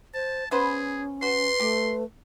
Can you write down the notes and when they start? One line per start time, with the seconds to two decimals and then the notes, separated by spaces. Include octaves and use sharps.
0.14 C5 A5
0.51 B3 C#4 G#4 B4 C5
1.22 F#4 B4 C6
1.60 A3 G4